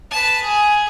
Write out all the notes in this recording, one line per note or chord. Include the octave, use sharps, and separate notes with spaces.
B4 A5
G#4